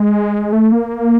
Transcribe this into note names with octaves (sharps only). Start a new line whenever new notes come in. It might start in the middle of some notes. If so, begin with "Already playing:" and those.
Already playing: G#3
A3
A#3